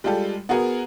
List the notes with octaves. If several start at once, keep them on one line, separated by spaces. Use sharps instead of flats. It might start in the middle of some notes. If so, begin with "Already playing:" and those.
G3 G#3 F4 G4 A4
B3 F#4 G#4 A#4